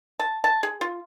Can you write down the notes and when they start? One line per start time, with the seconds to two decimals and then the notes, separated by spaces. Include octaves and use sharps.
0.19 A5
0.44 A5
0.63 G#4
0.81 F4